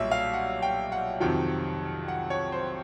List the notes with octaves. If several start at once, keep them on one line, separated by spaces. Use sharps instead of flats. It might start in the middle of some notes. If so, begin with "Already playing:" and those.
Already playing: B1 A#2 G3 E5
F5
F#5
G5
F#5
F2 C3 D#3 F#3 G5
F#5
C#5
C5